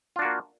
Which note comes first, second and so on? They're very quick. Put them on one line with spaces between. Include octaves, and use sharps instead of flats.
F4 D4 F#4 A#3